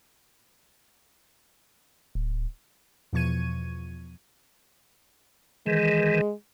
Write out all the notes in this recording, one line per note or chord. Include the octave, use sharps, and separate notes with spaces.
D1
E2 B2 F3 C#6 G#6 D#7
D#3 E3 G#3